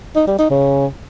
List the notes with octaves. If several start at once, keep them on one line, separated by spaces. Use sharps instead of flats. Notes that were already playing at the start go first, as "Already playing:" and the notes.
D#4
G3
D#4
C#3